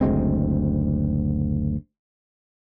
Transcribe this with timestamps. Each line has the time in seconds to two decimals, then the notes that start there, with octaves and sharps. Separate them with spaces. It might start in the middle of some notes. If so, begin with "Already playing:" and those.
0.01 F#1 D2 G#3 C4